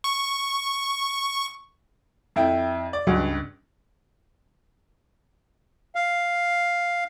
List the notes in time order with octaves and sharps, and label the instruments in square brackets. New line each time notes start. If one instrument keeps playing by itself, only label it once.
[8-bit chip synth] C#6
[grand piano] F2 E4 G5
D5
[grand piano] C#2 G2 [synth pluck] F#3
[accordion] F5